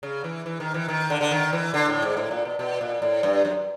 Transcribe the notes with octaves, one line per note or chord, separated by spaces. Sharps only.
C#3
E3
E3
D#3
E3
D#3
D3
D3
D#3
E3
D3
A2
G#2
A2
A#2
B2
B2
A#2
A2
G2
F#2